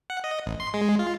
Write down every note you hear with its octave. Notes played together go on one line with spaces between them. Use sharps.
F#5
D#5
A1
C6
G#3
F4